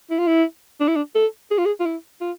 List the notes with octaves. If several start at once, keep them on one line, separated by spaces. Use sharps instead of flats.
E4
F4
E4
D4
E4
D4
A4
G#4
F4
G#4
F4
E4
F4